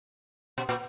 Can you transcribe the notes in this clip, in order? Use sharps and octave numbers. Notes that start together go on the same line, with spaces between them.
B2
A#2